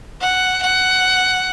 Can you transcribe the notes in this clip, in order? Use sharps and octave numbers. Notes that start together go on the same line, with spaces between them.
F#5
F#5